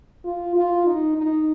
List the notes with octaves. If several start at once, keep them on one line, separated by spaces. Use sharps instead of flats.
F4
F4
D#4
D#4